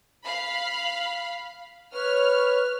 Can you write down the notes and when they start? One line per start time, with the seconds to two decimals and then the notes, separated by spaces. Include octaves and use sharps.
0.25 F5 B5
1.94 B4 C#5 F6